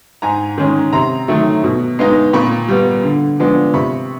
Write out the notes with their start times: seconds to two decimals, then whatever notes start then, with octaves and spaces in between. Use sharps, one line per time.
0.22 G#2 G#5 A#5
0.58 D#3 G#3 C#4
0.93 C3 A#5 C6
1.28 D#3 F#3 A3
1.64 B2
1.99 G#3 B3 D#4
2.33 A#2 B5 C#6
2.68 G3 B3
3.03 D3
3.40 F3 G#3 B3 D4
3.74 C3 B5 C#6